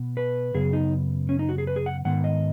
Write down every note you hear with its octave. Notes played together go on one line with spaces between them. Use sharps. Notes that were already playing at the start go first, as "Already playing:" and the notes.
Already playing: B2 B3
B4
F#2 C#3 B3 G#4
D#4
C#4
D#4
F#4
G#4
B4
G#4
F#5
G#2 D#3 B3 F#5
D#5